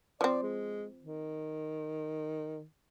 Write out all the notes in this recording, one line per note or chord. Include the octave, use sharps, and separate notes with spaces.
F3 C4 D5
G#3
D#3